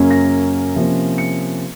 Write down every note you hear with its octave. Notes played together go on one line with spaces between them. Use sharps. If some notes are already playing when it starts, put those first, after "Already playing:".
Already playing: F#2 C#3 F#3 A#3 C#4
A#6
C3 F3 A#3 C#4
C#7